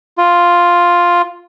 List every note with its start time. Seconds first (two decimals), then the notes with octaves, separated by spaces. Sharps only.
0.18 F4